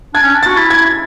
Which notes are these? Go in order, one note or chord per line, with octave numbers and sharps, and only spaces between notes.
D4 G#6
C#4
D4
F#4 A6
E4
G#6